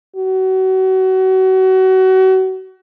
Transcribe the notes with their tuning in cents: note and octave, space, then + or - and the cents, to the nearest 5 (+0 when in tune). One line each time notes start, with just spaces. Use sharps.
F#4 +30